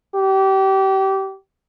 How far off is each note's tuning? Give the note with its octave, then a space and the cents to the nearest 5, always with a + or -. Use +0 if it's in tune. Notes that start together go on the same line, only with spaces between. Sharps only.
G4 -25